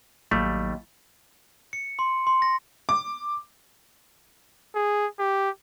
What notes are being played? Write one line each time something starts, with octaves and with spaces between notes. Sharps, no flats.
A1 D#2 F#3 G3 A3
C#7
C6
C6
A#6
D6
G#4
G4